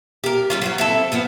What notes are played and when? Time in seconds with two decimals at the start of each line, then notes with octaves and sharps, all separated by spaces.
0.24 G4 A#4
0.50 G3 C#4 F4
0.62 F#3 F4 C5
0.78 C4 E4 A4
1.12 A#2 F3 B3